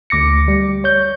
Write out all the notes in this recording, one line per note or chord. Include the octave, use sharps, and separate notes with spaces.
D2 D6 A#6 C#7
G3
C#5 G6